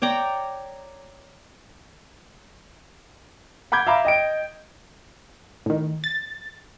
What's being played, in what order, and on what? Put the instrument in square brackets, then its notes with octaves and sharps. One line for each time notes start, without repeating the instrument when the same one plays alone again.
[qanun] C#5 D5 G5 A#5
[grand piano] F#5 B5 D6 G6 G#6
E5 F5 A#5 B5 D6
D#5 G5 D7
[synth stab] A2 D#3
A6